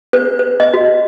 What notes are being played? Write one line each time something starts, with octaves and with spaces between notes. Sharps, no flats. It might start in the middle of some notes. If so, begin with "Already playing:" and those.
B4
B4
D#5
F#4